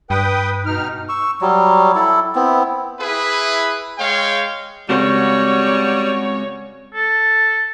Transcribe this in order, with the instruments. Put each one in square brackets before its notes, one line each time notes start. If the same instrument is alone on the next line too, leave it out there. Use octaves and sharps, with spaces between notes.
[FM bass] G2 [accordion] B4 G5 D#6
[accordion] B2 D#4 F6
[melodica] C#6 E6
F#3 G3
E4 A4
B3 C4 E4
[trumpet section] E4 G#4 B4
G#3 C#5 F5 G5
[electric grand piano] C#3 F#4 E7 [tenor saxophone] G3 [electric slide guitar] G#3 C4 A#4 [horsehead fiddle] C#5
[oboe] A4